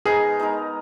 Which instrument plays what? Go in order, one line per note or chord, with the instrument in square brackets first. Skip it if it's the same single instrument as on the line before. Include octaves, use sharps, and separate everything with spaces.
[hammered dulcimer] B2 G#3 D#4 A#4 [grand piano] G#4
[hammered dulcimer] B2 G#3 D#4 A#4